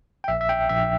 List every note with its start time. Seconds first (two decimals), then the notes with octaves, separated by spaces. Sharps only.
0.24 G5
0.28 A#1 E5
0.41 E5
0.49 G5
0.69 A#1 E5